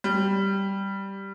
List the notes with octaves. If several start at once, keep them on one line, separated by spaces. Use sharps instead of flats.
G3